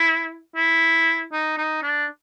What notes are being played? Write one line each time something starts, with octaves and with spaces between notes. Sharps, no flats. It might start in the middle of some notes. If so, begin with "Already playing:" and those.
Already playing: E4
E4
D#4
D#4
D4